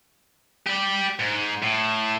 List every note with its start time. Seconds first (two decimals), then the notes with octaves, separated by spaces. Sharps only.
0.66 G4 D5
1.19 G#2
1.62 A2